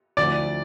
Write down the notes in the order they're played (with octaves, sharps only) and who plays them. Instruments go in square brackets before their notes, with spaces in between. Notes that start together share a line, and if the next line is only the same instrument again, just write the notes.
[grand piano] D2 D3 F3 A3 E4 [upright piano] D5